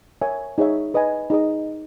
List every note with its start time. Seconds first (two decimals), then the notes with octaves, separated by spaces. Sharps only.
0.22 A#4 C#5 E5 G#5
0.58 D#4 G#4 C#5 E5
0.94 B4 D#5 G#5
1.30 D#4 G#4 D#5